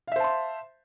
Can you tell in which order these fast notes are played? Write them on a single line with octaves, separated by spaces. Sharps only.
F5 E5 C5 A5 C6